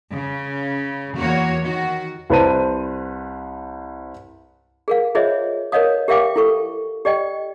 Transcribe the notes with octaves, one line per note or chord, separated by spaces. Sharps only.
C#3
E2 A#3 F#4 C#5
D#3 F#4
C2 B4 C5 A5 D#7
G#4 A#4 F5
F4 G#4 C5 C#5 D#5 E5
A#4 B4 C#5 D#5 F5 D#6
G4 A#4 E5 F5 G5 D6
E4 A4 C#6
G4 D5 D#5 G5